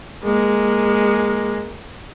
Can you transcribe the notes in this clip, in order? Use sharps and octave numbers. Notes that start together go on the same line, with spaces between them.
G#3 A#3